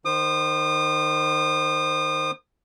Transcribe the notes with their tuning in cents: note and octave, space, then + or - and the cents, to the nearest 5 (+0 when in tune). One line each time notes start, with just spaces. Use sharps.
D#3 -25 C5 +0 D#6 -35